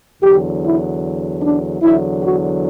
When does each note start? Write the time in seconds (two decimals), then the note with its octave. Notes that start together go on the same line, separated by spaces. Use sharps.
0.22 E2 D3 F#3 G4
0.63 E4
1.42 D4
1.82 E2 D3 F#3 E4
2.22 F#4